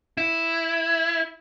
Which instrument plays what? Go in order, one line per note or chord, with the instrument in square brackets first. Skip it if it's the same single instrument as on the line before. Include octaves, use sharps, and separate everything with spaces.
[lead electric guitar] E4